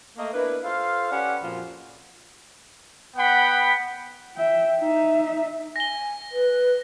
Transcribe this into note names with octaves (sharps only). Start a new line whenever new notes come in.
A3 A#3 D#5
B3 D4 E4 A#4 B4
F4 A4 C5 F5
C#4 G4 B4 D5 F#5
F2 A#2 F3 F4 F#4 C5
B3 F#5 G5 B5
E5 G5
D#4 E5
G#5 A#6 G7
B4